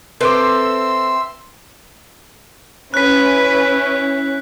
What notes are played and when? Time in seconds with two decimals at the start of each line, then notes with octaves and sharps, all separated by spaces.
0.21 C4 A4 B4 E5 C6 D6 E6
2.94 C#4 E4 B4 F#6 B6